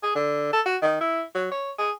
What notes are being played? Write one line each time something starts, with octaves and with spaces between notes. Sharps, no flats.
G#4
D3
A4
F#4
D#3
E4
F#3
C#5
G#4